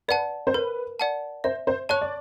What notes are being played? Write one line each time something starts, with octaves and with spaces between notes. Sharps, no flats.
B4 D5 F#5 A5
C5
A#4 B4
D5 F#5 A5
C5 E5
C5
C#5 A5 C#6 F#6
D5